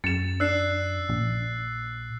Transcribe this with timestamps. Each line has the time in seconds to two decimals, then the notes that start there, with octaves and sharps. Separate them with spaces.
0.04 F#2 A6 C#7 E7
0.40 D4 E6 F#6 C7
1.09 A#1